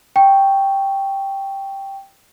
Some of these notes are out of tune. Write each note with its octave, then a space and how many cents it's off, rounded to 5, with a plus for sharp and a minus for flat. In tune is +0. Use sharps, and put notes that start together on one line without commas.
G5 +0 C#6 +0